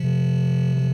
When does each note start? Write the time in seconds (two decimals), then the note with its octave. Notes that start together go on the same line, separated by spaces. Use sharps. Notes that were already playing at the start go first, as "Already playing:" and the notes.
Already playing: C3 F3
0.76 F3